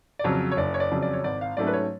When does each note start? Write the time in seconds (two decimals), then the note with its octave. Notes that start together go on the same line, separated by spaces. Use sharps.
0.19 D5
0.24 F2 C#3 F#3 C#5
0.51 C#5
0.57 F#1 D5
0.74 C#5
0.80 D5
0.91 F2 C#3 F#3
1.02 D5
1.13 C#5
1.24 G#1 D5
1.41 F5
1.57 G#2 F#3 A3 C#4 D5
1.67 B4
1.73 C#5